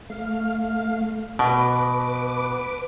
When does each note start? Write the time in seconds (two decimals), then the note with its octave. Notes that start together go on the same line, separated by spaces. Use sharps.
0.10 A3 F5
1.39 B2 B4 D6